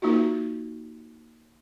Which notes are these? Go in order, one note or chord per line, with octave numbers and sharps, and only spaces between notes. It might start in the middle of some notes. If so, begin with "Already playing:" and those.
A#3 D#4 F4 F#4